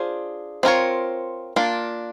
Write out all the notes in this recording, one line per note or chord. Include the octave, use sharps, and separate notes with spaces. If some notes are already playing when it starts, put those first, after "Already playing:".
Already playing: D4 F4 G#4 C5
C4 F4 A#4 C#5
A#3 D4 F4